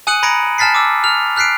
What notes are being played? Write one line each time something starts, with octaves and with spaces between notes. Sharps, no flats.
G#5 D#6 F#6 C#7 D#7 F#7
A#5 B5 G#6 A#6 C#7 D7
G#5 A5 F6 A6 B6 C7
D6 E6
F6 F7
F6 F#6 B6 C7 D7